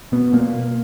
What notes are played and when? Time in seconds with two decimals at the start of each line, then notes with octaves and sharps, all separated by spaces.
0.12 B2 B3
0.33 B2 A#3